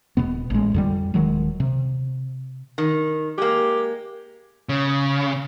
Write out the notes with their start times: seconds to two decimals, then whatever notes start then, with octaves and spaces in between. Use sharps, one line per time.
0.17 D#1 E2 B2 B3
0.50 A1 G#3
0.74 F2 D3 G3
1.14 D#1 D#3 F#3 G#3
1.60 C3
2.78 D#3
3.38 G#3 A#3 G4
4.69 C#3